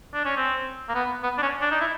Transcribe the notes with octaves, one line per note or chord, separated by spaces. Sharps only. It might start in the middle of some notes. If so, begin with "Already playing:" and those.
D4
C#4
C4
A#3
B3
B3
D4
C#4
D4
D#4
E4